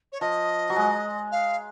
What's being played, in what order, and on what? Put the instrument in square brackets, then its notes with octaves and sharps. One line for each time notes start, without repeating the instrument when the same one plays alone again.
[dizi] C#5
[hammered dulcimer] F3 [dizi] D#5
[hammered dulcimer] F#3
G#3
[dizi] F5